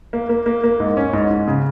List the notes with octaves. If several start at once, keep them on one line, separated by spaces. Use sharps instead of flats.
A#3
A#3
A#3
A#3
G#2
C#4
G#2
G#2
C#3